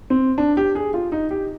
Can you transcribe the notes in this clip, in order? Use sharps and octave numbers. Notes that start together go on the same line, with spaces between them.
C4
D4
G4
G#4
F4
D#4
G4